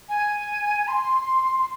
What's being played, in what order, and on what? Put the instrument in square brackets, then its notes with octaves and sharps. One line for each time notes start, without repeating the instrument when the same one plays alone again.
[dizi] G#5
C6
C6